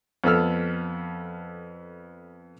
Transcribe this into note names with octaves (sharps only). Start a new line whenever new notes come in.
F2 B3 A4 E6 F6